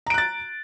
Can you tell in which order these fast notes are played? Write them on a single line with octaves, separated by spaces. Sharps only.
A#5 D7 F#6 A6